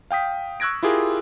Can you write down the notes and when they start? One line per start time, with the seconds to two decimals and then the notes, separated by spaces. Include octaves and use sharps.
0.11 F5 G5 D#6 B6
0.60 C#6 E6 F#6 G#6 A#6 D7
0.83 E4 F4 G4 G#4 A#4